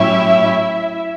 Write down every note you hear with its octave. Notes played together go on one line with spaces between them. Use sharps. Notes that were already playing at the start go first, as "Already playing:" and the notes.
Already playing: A2 F#3 C#4 E4 G4 C#5 E5